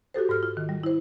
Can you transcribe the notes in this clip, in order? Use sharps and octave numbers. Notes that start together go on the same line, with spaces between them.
F#4 G4 A4 C5
G#2 A4 F6
F4
D#3
G3
E4 C5